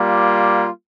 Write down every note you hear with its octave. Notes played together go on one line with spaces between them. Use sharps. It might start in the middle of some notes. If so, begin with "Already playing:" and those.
Already playing: G3 A#3 F4